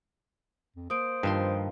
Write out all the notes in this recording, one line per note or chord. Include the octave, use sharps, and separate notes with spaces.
F2
A#3 C5 D#6 D7
G2 D#3 F3 C6